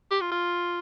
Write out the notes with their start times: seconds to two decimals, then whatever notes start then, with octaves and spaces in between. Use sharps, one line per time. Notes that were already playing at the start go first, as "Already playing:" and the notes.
0.11 G4
0.21 F4
0.32 F4